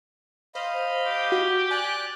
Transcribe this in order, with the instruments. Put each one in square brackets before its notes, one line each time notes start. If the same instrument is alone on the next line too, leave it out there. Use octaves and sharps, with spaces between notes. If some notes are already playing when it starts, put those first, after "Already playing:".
[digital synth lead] C5 [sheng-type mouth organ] D#5 F5 B5
[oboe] G4
[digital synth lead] F#4
[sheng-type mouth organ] D5 F#6 [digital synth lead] G#5